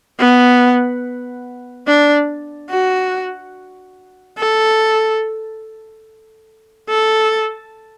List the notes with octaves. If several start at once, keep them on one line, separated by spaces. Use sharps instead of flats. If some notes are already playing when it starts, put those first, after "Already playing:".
B3
D4
F#4
A4
A4